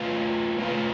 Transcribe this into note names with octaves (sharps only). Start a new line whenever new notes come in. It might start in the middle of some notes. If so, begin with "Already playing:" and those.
Already playing: A3 F4 B4 F5
A3 F4 B4 F5